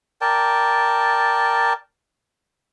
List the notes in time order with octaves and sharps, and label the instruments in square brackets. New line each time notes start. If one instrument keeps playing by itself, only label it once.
[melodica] A#4 D5 G5 A5